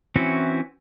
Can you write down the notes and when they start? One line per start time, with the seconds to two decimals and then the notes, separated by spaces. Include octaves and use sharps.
0.16 E3 C4 C#4 E4 F#4